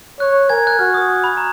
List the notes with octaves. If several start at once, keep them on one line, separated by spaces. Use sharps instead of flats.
C#5 F#6
A#4 G#5 G#6
F#6
F#4 F6
D#6
C#6
B5
A#5